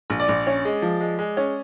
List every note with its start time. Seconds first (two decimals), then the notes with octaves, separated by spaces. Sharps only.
0.10 A#1
0.20 D5
0.28 A#1
0.47 C#4
0.65 G#3
0.82 F3
1.00 G#3
1.19 G#3
1.37 C#4